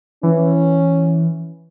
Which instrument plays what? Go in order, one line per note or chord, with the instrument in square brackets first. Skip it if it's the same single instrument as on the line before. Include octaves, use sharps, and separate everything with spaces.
[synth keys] E3 [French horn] C#4